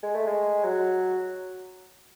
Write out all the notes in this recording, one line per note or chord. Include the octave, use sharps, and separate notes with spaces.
G#3
A3
G#3
F#3